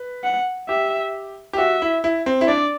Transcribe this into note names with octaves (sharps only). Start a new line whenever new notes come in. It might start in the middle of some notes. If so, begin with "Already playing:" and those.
Already playing: B4
F#5
G4 E5
G4
F#4 E5
E4
E4
C4
E4
D4 D5